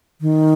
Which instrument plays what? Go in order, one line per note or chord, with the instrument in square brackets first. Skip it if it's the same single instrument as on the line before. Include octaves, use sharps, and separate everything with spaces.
[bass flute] D#3